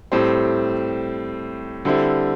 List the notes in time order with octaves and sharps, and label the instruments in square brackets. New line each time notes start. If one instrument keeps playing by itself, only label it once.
[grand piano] A2 G3 C4
D3 G3 C4 E4